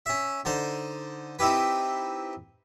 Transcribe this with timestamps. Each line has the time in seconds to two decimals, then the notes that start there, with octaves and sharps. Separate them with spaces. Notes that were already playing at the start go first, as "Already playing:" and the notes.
0.06 C#4 E5
0.45 D3 D#4 C5
1.39 C4 D#4 E4 G4 B4